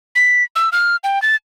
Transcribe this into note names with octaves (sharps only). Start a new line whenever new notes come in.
B6
E6
F6
G5
A6